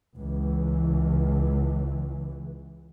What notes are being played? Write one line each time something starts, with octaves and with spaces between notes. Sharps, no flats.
C#2 E3